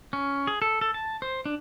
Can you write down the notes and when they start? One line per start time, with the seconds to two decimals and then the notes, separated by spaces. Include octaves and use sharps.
0.13 C#4
0.47 G#4
0.62 A4
0.81 A4
0.94 A5
1.22 C5
1.46 D4